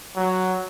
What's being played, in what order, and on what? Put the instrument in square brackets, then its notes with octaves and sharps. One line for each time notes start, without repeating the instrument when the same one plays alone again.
[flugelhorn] F#3